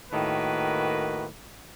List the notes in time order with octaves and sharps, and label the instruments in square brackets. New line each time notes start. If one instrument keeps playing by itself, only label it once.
[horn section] A2 D#3 A#3 F#4 B4